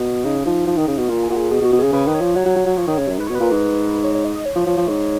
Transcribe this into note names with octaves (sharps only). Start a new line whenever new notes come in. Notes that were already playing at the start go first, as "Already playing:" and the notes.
Already playing: B2
C#3 D#4
F3 D#4
F3
D#3
C#3
B2
A#2 F4
G#4
A#2 F#4
G#4
B2 G#4
B2
F#4
B2
C#3 G#4
C#3 B4
D#3
C#5
F3
F#3 C#5
F#3
F#3
F#3
F3
D#3
C#3
F#2
G#2 B4
B2 C#5
B4
A#2
G#2
C#5
C#5
D#5
D#5
C#5
F3
F3
F3
G#2